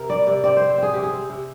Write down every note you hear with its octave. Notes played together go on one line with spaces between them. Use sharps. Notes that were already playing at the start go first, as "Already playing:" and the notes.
Already playing: C3 A#4
G3 D5
C3 D5
C4 D5
C4 C5
C5
C4 G#4
C3 G4
G#4
C4
C3